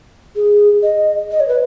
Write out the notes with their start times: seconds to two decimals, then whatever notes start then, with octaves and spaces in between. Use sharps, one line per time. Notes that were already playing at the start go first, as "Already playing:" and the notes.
0.36 G#4
0.83 D#5
1.31 D#5
1.40 C#5
1.48 B4